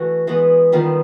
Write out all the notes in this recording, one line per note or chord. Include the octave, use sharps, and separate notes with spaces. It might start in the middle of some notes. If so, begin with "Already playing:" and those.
Already playing: E3 A3 F#4
E3 G#3 B3
D#3 G3 B3 F4